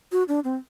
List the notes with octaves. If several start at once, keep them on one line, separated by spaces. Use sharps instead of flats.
F#4
D4
C4